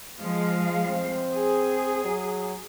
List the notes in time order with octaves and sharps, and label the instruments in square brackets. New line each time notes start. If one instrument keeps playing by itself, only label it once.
[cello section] F3 G#3 F5
[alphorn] C4
[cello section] G#4
[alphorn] F#3